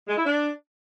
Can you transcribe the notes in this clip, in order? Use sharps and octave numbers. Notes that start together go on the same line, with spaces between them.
G#3
E4
D4